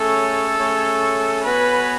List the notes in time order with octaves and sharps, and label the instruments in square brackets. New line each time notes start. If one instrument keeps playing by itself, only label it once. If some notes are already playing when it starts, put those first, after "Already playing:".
Already playing: [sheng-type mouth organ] A3 C#4 G#4 C#5 [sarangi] A4
[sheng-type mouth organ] A3 C#4 G#4 C#5
[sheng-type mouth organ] B3 F#4 C#5 G#5 [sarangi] B4